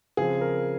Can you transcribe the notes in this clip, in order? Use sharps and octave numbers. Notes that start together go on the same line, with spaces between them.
C#3 F3 C4 G#4
A#4